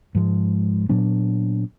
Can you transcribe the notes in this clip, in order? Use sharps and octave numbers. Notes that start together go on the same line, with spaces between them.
G#2 F3 G#3
A#2 F#3 B3 D4